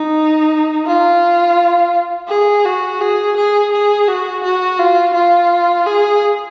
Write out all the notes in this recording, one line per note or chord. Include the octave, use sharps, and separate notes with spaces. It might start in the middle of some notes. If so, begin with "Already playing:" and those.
Already playing: D#4
F4
G#4
F#4
G#4
G#4
G#4
F#4
F#4
F4
F4
G#4